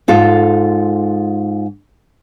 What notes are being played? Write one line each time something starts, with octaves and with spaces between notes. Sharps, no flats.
G#2 F4 A4